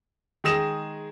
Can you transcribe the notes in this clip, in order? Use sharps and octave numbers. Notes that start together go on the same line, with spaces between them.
D#3 G#3 G#4 D#6 A#6 E7